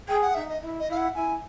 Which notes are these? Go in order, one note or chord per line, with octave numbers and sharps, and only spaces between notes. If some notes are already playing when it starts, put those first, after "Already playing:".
G#4 G5
F#5
D#4 E5
D#5
E4
D#5
E4 F5
F#5
E4 G#5